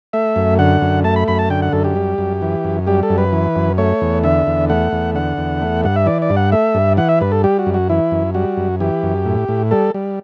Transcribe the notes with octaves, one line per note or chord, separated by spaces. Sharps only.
A3 E5
F#2
D3 F#5
F#2
A3 A5
B5
F#2 B5
A5
D3 G5
F#5
F#2 A4
G4
G3
F#2
E3
F#2
G3 G4
A4
F#2
B4
E3
F#2
A3 C#5
E2
D3 E5
E2
A3 F#5
E2
D3 F#5
E2
A3
G2 F#5
E5
E3 D5
D5
G2
F#5
A3 E5
G2
E3 F#5
E5
G2 B4
A4
G3 G4
F#4
F#2
F#4
E3 E4
F#2
G3 F#4
F#2
E3 G4
F#2
A2
A2
G3 A4
G3